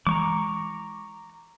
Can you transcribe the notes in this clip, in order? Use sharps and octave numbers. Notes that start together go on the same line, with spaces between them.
E3 G#3 A#5 C#6 D6